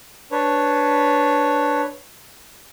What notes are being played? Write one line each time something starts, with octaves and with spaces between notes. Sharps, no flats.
D4 B4 C#5